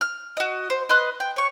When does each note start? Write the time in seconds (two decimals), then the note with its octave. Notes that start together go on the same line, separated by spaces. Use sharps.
0.01 F6
0.37 F#4 D#5
0.70 C5
0.89 B4 D#5 C6 F#6
1.20 G5
1.36 C#5 C#6